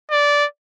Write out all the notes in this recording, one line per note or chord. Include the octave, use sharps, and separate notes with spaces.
D5